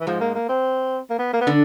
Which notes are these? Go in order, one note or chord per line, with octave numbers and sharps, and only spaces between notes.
E3
G#2 F3 G#3
A#3
A#3
C4
A#3
B3
A#3
B3
D3 D4